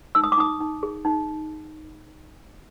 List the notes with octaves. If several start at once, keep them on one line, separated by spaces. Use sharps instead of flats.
D#4 E6
D#6
D6
D#4 D#6
D#4
G#4
D#4